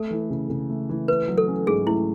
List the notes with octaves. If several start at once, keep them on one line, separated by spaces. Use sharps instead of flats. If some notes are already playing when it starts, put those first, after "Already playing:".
Already playing: A3 A4
E3
C#3
C#3
A3
E3
A3 B4
F#3
A4
C#4
G#2 G#4
A3 E4